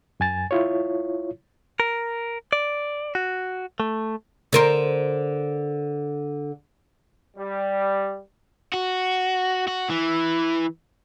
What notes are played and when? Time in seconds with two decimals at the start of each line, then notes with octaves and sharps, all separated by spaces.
0.20 F#2 G#5 A6
0.51 E4 F4 C#5
1.80 A#4
2.53 D5
3.15 F#4
3.80 A3
4.53 D3 A#4 C5
7.36 G3
8.74 F#4
9.68 F#4
9.90 E3